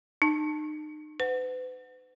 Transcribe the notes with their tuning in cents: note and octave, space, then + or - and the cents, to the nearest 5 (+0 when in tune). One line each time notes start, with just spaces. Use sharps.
D#4 -35 A5 +0
B4 +40 F#5 +0